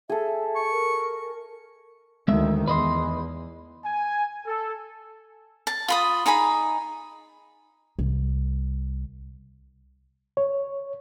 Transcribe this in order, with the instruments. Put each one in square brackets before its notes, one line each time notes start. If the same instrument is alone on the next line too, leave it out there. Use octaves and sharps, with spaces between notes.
[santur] G#4 A4 [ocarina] E5
[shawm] C#6
[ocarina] A#4
[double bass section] D2 D#3 [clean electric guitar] G#3 E5
[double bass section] E2 [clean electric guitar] B4 D#5 C6
[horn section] G#5
A4
[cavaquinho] A5
F4 B5 D#6
D#4 G#4 G#5 B5
[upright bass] C2
[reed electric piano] C#5